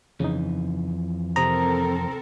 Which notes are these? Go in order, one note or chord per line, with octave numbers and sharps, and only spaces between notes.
F2 C#3 E3 D#4
C3 C4 A4 A#4 C5 A#5 D#6